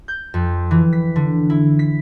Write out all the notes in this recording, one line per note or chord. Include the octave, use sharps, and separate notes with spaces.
G6
F2
E3
B6
D3
E4
B6